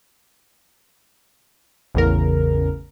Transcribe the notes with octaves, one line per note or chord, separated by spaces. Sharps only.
A1 E2 C#3 A#4